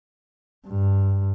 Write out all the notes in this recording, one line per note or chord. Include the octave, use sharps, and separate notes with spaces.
G2